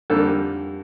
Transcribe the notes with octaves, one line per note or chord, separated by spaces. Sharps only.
F2 D3 G3 A#3 A4